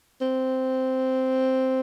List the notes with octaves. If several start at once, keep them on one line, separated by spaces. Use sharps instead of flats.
C4